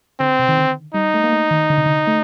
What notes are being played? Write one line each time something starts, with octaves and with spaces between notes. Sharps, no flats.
D3 C4
C3
D#3
D3
G3 D#4
A3
A#3
A3
D#3
D3
C3
D3
A3